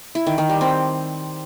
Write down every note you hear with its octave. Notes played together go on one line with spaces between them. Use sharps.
E4
D#3
D#3
G3
C4